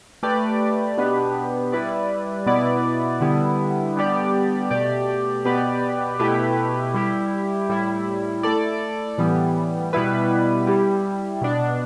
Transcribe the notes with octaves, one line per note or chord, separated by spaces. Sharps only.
A3 G4 B4 D5
B2 B3 D4 G4 B4
G3 E4 B4 D5
B2 B3 E4 B4 D5
D3 G3 B3 E4
D3 G3 B3 G4 D5
B2 A3 G4 D5
B2 B3 G4 B4 D5
B2 A3 E4 G4 B4
G3 E4 G4
A2 G3 E4
A3 E4 A4 D5
A2 E3 G3 B3
B2 G3 B3 E4 B4
G3 E4 G4
B2 B3 D4